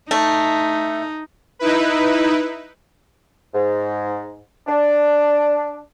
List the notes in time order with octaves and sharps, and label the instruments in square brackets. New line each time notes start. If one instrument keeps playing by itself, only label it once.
[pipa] A3 [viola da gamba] D#4
[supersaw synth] D#4 E4 B4
[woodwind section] G#2
D4